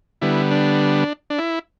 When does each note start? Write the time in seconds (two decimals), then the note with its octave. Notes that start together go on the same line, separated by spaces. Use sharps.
0.22 D3 G3 B3 E4
0.51 D4
1.30 D4
1.38 E4